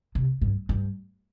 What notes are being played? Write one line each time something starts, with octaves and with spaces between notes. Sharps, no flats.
C3
G2
G2